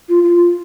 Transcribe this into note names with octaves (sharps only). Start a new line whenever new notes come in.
F4
F4